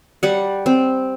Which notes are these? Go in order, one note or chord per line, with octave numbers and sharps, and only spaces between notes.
G3 F#5
C4